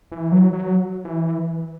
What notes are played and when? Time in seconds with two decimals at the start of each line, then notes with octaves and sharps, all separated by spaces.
0.12 E3
0.32 F#3
0.53 F#3
1.05 E3